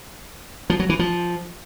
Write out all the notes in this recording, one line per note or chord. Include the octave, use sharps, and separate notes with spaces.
F3
F#3
E3
F3